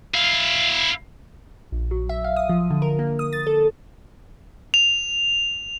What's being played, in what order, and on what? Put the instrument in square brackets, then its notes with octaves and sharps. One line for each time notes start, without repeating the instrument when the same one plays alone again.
[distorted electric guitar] E4 F5
[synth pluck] A#1
F#3
E5
F5
D#6
F3
D3
A#4
A#3
D#6
A6
A4
[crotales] F7